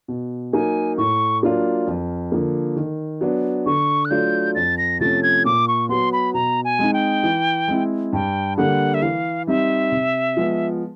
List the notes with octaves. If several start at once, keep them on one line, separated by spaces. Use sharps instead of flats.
B2
F#3 A#3 D#4 G#5
A2 C#6
F#3 A#3 D4 F4
F2
D3 F3 A#3
D#3
F#3 B3 D4
D3 C#6
F#6
F#3 A3 D4 F4 G6
F2 A6
A#6
C3 F3 A3 C#4 A6
G#6
A#2 D6
C#6
F#3 B3 C6
B5
B2 A#5
G#5
G#3 C4 D#4
G5
E3
G#3 C4 E4
G2 G5
D3 G3 A#3 F#5
E5
E3 F5
G3 C4 D#4 E5
C3
F3 G#3 B3